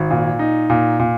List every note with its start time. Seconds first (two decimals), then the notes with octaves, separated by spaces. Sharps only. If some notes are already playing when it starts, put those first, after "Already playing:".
Already playing: G#1
0.10 A#2
0.39 D#4
0.70 A#2
0.99 A#2